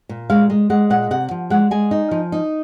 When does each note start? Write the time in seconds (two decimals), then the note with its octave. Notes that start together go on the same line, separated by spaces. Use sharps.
0.09 A#2
0.30 G#3 F5
0.50 G#3
0.70 G#3 F#5
0.90 A#2 F#5
1.11 C3 F#5
1.31 F3
1.50 G#3 F#5
1.71 G#3 G#5
1.91 D#4
2.11 F3
2.32 D#4